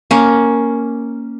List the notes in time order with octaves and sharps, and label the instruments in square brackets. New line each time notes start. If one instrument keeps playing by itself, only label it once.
[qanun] A#3 C#4